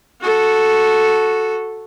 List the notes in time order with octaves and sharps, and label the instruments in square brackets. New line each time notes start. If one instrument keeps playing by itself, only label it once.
[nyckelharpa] F#4 A4